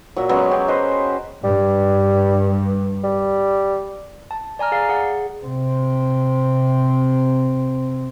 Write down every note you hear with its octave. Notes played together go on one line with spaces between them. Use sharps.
A#2 F#3 E5
F#3 G#3 B3 C#4
C#4 G4
B4 C5 D#5
G2 G3
G3
A5
D5 G#5 A#5 F6
G#4 D5 F5
G#4 F#5
C3 C4